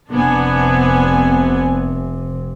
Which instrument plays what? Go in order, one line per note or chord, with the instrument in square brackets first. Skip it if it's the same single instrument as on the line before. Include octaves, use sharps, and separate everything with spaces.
[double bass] F1 C3 [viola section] B3 D4 G#5